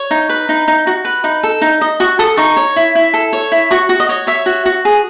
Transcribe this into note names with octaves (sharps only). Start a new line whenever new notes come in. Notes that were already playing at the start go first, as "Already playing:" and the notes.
Already playing: C#5
D#4
B4
D#4
D#4
F#4
B4
D#4
A4
D#4
D#5
F#4 C#6
A4 D#6
D#4 C#6
C#5
E4
E4
A4
C#5
E4
F#4 C#6
F#4
D#5
C#5
C#5 E5
F#4
F#4
G#4